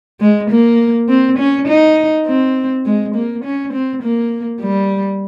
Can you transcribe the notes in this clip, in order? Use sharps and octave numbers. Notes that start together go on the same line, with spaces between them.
G#3
A#3
C4
C#4
D#4
C4
G#3
A#3
C#4
C4
A#3
G3